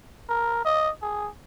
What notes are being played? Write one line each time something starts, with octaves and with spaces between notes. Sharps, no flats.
A#4
D#5
G#4